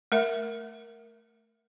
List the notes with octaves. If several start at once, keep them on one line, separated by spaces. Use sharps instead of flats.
A3 A#4 E5